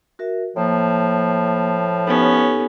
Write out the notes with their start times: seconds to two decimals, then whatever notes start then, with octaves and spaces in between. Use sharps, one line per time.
0.19 F#4 A#4 E5
0.56 A2 F3 A#3
2.07 B3 C#4 D#4 G4 A4